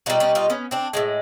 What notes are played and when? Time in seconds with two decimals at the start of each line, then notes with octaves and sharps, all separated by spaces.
0.06 B2 G3 D#4 F4
0.20 C#4 D#4
0.35 D#4 F4
0.50 B3 C#4
0.71 C4 D4
0.93 A2 E3 G#3